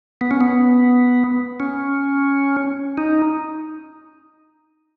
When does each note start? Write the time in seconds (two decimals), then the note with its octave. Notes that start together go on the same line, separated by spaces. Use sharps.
0.21 B3
0.31 C#4
0.41 B3
1.60 C#4
2.97 D#4